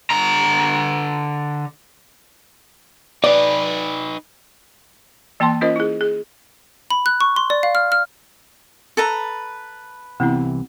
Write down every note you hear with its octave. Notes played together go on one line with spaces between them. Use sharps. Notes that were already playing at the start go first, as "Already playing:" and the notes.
D3 A#5
D#4 B4 D5
E3 A#3 G5 A5 C6
C#4 F4 A#4 C5 D#5
E4 G#4
G#4
B5
F#6
C#6
C6
D5
F5
F6
F6
A4 B4 A#5
C2 C3 E3 B3 C4 E4